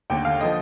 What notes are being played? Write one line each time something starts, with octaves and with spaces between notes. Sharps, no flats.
D#2 D3 A3 G5
F5
D3 F3 D#5